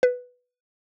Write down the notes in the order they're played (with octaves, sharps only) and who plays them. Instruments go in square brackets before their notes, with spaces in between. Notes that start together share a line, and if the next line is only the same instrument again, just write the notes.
[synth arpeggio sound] B4